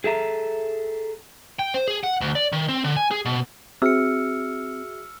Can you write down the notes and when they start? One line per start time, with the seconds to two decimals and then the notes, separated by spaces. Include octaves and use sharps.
0.04 G#4 A4 E5 A#5
1.59 G5
1.74 C5
1.87 G#4
2.04 F#5
2.21 D2
2.35 D5
2.53 D#3
2.69 C4
2.84 D3
2.96 G#5
3.11 G#4
3.25 B2
3.82 C4 F#4 G#4 E5 E6 F6 C#7